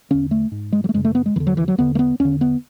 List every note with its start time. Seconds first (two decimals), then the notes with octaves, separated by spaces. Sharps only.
0.10 E2 D3 C#4
0.31 A3
0.52 G#2
0.72 G#3
0.84 F#3
0.89 A3
0.94 F#2 G#3
0.97 C#3
1.05 A3
1.15 B3
1.26 G#3
1.36 E2 D3 E3
1.47 F#3
1.57 E3
1.68 F#3
1.78 E2 D3 B3
1.95 A3
1.99 B3
2.20 E2 D3 C#4
2.41 B3